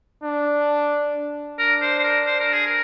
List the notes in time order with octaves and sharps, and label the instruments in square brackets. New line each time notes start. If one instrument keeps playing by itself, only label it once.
[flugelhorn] D4
[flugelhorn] D4 [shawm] A#4
[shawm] C5
C5
A#4
C5
A#4
G#4
A#4